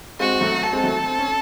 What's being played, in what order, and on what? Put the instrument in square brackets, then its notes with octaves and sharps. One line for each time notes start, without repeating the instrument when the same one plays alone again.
[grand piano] G#3 C4 [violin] F#4
[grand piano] F#3 A3
[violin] A4
[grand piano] G#3 C4
F#3 A3
C4
C#4